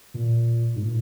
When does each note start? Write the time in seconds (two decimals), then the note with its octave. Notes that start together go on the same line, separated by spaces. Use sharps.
0.14 A#2
0.76 G#2
0.83 A#2